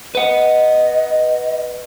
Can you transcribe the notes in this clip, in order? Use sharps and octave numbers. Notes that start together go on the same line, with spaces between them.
B4 D#5 F#5